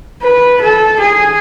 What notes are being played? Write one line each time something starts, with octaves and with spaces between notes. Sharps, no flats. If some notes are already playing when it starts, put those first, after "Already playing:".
B4
A4
G#4